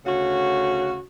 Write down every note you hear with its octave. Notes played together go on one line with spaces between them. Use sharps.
D2 C#3 C#4 F#4